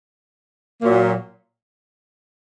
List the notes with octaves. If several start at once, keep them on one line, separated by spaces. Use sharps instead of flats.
A#2 F#3 A#3